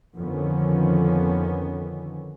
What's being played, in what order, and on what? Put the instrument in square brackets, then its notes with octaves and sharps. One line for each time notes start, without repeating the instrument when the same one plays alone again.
[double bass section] F2 D3 D#3 F3 B3 C#4